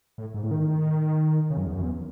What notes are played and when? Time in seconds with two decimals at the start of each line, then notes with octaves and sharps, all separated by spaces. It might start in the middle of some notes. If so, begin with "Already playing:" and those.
0.18 A2
0.34 G#2
0.43 A2
0.51 D#3
1.50 C#3
1.57 F#2
1.66 E2
1.74 F#2
1.83 E2